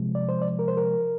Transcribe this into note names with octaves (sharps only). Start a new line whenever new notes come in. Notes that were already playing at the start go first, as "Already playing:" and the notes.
Already playing: C3 F3 G#3
D5
C5
D5
A#4
C5
A#4